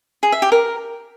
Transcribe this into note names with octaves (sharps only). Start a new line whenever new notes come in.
G#4
E5
G4
A#4